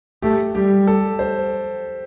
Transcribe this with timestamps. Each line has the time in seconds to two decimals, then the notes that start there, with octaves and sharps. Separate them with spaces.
0.22 A3 G4
0.55 G3 G4
0.87 A4
1.19 C5